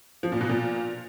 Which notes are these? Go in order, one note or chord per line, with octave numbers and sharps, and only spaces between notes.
F3
A#2
B2
A#2